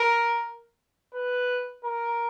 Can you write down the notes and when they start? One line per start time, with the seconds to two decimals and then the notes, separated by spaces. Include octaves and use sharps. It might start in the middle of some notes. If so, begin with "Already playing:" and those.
Already playing: A#4
1.14 B4
1.84 A#4